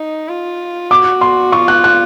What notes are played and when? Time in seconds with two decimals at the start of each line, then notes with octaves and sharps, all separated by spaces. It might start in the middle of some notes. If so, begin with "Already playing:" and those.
Already playing: D#4
0.28 F4
0.91 F#4 D6
1.21 C6
1.52 F4 C#6
1.68 F#6
1.84 F#6